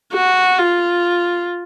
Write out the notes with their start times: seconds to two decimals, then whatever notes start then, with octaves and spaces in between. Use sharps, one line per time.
0.13 F#4
0.58 F4